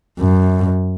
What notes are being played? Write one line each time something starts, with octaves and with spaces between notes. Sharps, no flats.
F#2